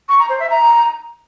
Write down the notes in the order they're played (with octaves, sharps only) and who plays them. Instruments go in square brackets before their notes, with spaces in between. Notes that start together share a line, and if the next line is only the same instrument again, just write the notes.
[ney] C#6
A#5
C5
E5
A#5